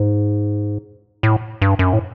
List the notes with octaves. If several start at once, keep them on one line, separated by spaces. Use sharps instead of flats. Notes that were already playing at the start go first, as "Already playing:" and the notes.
Already playing: G#2
A2
G2
F#2
A2